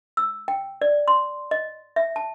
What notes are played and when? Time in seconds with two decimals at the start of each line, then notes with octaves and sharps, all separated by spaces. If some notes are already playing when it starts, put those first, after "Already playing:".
0.17 E6
0.48 G5
0.82 D5
1.08 C6
1.51 D#5
1.96 E5
2.16 A5